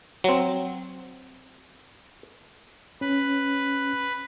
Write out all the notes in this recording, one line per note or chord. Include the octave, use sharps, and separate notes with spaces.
F#3 C4
C#4 B4